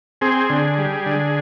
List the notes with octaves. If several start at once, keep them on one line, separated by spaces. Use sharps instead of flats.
C4 G#4
D3
G3
D3